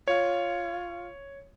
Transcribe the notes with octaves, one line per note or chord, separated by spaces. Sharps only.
F4 C#5